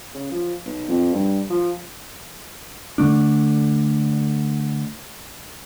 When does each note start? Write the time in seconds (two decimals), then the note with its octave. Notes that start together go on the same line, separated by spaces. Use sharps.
0.14 C#3
0.31 F3
0.65 B1
0.89 F2
1.13 G2
1.50 F3
2.98 D3 A3 D4